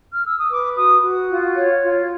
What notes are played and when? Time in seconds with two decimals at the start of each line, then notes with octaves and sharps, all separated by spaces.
0.11 F6
0.24 E6
0.37 D#6
0.50 B4 D6
0.76 F#4 D#6
1.02 F#4
1.29 F4
1.55 C#5
1.82 F4